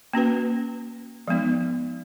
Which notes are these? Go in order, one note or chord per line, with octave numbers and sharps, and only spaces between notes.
A#3 C#4 F#4 B4
F3 G#3 B3 D#4